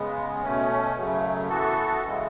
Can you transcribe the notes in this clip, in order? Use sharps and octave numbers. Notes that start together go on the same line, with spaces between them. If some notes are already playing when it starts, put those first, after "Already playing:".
Already playing: C#3 G#3 B3
B2 A3 C#4
F#2 C#3 F#3 A3
E3 B3 F#4 A4
C#3 E3 G#3